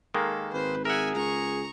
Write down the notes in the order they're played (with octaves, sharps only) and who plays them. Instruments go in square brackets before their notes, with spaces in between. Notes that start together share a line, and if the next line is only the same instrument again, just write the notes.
[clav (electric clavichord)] D#3 G#3 A#3 [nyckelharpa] A4
[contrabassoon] G#1 [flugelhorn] B4 [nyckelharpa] C5
[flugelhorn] G#4 [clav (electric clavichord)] A#4 F#5 [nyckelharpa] E5 G#5
[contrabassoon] C#2 [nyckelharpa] A#5 C#6